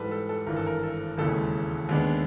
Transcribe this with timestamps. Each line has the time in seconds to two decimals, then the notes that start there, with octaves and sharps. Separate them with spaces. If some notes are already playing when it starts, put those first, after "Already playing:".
Already playing: G#2 E3 G3 A4 B4
0.11 A4
0.29 A4
0.46 G#1 G2 E3 A#4
0.56 A4
0.66 A#4
0.83 A4
1.17 E1 D#2 C#3 E3 G#3 A4
1.89 D#2 D#3 G#3 B3 D4